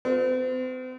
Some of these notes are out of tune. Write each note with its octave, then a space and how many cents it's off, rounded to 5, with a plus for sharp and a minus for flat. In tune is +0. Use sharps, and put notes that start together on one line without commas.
C4 -40 F4 +35